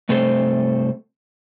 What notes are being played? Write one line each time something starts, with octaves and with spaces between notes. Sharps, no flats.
G2 C3 A3 C4 A4 C5